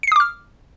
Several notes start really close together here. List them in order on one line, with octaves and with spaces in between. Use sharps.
C#7 C7 D#6 D6 F6